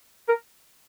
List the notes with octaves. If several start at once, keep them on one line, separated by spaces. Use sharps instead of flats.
A#4